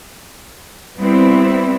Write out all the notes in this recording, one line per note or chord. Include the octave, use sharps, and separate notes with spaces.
G3 B3 C4 E4